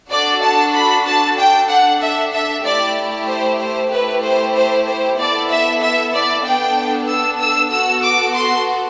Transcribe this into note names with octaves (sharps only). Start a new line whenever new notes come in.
D4 F#4 A4 D5
A5
B5
A5
D4 A4 G5
F#5
E5
E5
A3 E4 G4 D5
C5
C5
A3 E4 G4 B4
C5
C5
C5
B3 E4 A4 D5
E5
E5
D5
B3 D4 A4 G5
E6
E6
B3 F#4 A4 E6
D6
C6